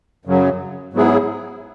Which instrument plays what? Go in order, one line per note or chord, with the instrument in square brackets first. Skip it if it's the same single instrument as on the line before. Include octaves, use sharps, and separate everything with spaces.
[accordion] F#2 C#3 F#3
G#2 F#3 B3 E4 G#4